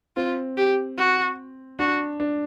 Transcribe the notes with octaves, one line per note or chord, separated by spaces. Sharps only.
C4 F4
G4
F#4
D4 F#4
D4